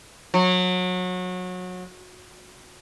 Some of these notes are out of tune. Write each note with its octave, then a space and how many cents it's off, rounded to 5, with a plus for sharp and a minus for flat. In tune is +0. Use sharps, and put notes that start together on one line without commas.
F#3 -25